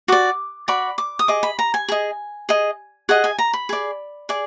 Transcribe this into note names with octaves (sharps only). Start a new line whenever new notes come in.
F#4 D5 D6
F#4 D5 B5
D6
D#6
G#4 D#5 D6
B5
A#5
G#5
G#4 D#5
G#4 D#5
G#4 D#5 F#5
G#5
A#5
B5
G#4 D5
G#4 D5